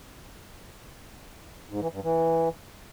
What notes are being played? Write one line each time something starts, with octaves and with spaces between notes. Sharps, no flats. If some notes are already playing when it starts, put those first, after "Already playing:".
G#2
E3
G2
E3